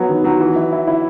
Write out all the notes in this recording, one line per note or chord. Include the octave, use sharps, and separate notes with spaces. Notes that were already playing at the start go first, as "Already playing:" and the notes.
Already playing: F#3 B3
D#3
F#3
E3
E4
E4
E4